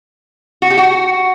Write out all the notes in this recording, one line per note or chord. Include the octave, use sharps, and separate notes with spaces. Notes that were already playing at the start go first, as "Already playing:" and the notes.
F#4
G4
F#4